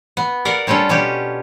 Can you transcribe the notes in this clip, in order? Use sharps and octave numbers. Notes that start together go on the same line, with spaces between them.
B3
A#4 D5 F5 F#5
G3 C#4 D4 F4 A4
B2 C#4 D4 G4